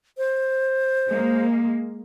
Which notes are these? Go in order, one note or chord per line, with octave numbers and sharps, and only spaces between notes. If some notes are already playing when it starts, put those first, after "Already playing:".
C5
G#3 A#3